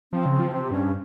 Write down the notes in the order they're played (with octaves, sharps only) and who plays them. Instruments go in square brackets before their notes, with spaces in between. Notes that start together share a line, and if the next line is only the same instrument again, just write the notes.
[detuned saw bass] F3 [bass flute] C4
[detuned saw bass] C#3
F3
[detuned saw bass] C3 [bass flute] C4
[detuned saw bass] G2 [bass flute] C#4